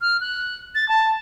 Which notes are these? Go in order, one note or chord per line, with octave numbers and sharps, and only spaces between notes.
F6
F#6
A6
A5